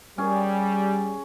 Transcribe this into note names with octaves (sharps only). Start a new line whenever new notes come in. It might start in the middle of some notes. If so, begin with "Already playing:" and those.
G3 C#4 G#4